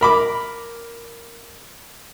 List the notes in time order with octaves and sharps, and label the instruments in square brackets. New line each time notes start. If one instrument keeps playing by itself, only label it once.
[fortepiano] A#4 B5 D6